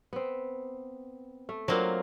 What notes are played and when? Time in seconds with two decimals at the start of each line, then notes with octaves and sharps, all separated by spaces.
0.13 B3 C4
1.49 A3
1.68 F#3 A#3 C4 D4 F4